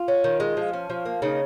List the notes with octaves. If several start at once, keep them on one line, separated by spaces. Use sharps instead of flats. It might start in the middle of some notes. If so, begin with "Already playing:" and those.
Already playing: F4
C#4
D#3
G#3
F3
C#4
F3
A#3
C#3 D#4